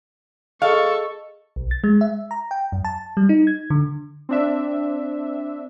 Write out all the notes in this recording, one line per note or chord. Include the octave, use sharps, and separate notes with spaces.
G#4 A4 D#5 F5 C#6
B1
A6
G#3
E5
A#5
G5
F#2
A5
G3
D#4
G#6
D3
C4 D4 E5